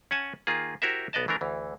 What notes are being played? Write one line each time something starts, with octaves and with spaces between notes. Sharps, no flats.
C#4 F#5 G#5 A5
D#3 A#3 F4 G#4
E4 F#4 G4 A#4 C5 E5
B1 B3 D5 D#5 A5
E3 A3 D4 A#4
D2 E3